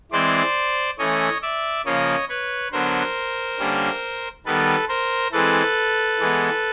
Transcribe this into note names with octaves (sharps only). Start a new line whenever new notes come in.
E3 G#3 C4 C5 D5
E3 A3 C#4 C#5 D#5
D5 E5
C#3 F3 A#3 C#5 D#5
B4 C#5
D3 F#3 B3 A#4 C5
D3 G3 A#3 C#4
D#3 G3 B3 A4 B4
A#4 C5
E3 G#3 C4 A4 B4
E3 G#3 B3